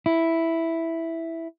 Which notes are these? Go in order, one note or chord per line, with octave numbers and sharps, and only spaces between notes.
E4